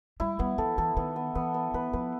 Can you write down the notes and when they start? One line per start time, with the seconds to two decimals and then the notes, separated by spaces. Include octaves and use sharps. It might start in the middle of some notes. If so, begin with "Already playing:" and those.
0.20 G3 E4
0.39 G3 B3
0.58 F3 A4
0.78 E3 A4
0.97 D#3 B3
1.16 B3
1.35 E3 B3
1.54 B3
1.74 E3 B4
1.93 F3 B4